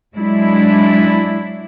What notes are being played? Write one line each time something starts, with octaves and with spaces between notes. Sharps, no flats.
F#3 G#3 D4 E4